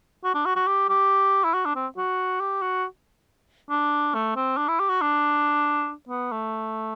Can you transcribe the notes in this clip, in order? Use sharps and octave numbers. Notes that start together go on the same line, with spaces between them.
F#4
D4
F#4
F#4
G4
G4
E4
F#4
D4
C4
F#4
G4
F#4
D4
A3
C4
D4
E4
G4
F#4
D4
B3
A3